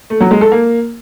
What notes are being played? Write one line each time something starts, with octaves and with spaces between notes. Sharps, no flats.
A3
F#3
G#3
A4
A#3